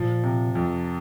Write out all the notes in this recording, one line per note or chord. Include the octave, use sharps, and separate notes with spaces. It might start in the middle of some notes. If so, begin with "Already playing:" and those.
Already playing: A#2 F3
C3
F2